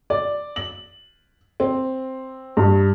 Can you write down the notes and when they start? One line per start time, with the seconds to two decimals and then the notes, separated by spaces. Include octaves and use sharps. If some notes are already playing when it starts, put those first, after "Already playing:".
0.10 D5
0.56 F#7
1.60 C4
2.57 G2